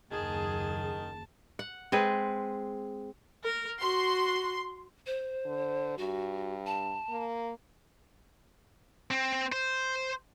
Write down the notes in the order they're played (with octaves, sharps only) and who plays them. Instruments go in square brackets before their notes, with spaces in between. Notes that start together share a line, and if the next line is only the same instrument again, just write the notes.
[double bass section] F#1 D#2 [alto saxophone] D#3 [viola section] G#4 [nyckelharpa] A5
[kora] F#5
G#3 C4 G#4 B4
[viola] A#4
[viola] F#4 [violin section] C6
[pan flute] C5
[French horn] D3
[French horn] G2 [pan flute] F#4
[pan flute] A5
[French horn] A#3
[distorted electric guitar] C4
C5